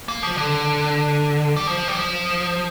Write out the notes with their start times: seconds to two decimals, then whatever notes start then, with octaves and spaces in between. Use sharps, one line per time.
0.08 A#3
0.23 F3
0.38 D3
1.56 G3
1.67 F3
1.88 G3
1.95 F3